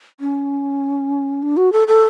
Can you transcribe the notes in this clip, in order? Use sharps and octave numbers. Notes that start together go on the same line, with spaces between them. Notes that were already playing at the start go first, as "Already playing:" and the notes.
C#4
D4
F#4
A4
A4